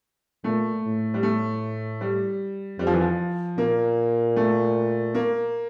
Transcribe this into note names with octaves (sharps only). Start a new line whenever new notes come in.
A#2 A3
A2
G3
A3
G3
F2 G3
F3
E3
F3
A#2 A#3
A3
A#3